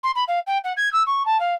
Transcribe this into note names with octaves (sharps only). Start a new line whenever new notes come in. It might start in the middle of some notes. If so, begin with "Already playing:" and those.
C6
B5
F5
G5
F#5
G#6
E6
C#6
A5
F5